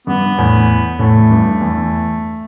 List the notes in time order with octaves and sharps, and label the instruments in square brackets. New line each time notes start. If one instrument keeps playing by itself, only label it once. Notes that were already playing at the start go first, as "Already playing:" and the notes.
[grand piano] G2 [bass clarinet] B3
[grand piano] E2 A2
[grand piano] E2 A2 [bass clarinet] A3
[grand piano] G2
E2